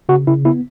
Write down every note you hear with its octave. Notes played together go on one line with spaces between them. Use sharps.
C#3 F#4
C#3 E4
B3 E4